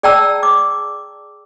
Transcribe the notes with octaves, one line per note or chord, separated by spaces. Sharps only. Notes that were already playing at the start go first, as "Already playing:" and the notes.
G#4 D5 G5 A5 A#5 E6
D6